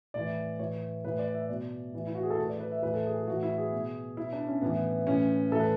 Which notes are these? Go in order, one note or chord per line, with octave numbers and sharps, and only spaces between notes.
A2 E3 D5
A2 E3 C#5
A2 E3 B4
D5
E5
B2 D5
A2 E3
E4
F#4
G#4
A4
A2 E3 B4
D5
B4
E5
A2 E3 B4
A4
G#4
G#4
A2 E3 F#4
E4
G#4
B2
B2 E4
D4
C#4
A2 E3 B3
A2 E3 C#4
A2 E3 A4
B4